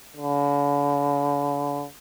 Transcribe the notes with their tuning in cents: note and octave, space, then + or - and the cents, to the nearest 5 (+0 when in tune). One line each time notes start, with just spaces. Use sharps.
D3 -45